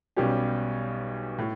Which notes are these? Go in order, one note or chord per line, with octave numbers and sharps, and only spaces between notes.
B1 B2 G3 C#4 G4
A2